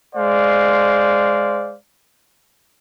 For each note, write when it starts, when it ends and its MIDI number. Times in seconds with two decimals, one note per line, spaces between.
0.16 1.76 56
0.16 1.76 72
0.16 1.76 74
0.16 1.76 77